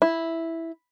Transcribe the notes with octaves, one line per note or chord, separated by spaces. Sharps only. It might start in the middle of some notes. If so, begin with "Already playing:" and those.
E4